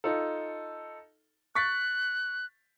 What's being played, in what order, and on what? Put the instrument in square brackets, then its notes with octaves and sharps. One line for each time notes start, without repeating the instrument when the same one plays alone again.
[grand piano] D#4 F4 A4
[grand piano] C#6 A6 B6 [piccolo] F#6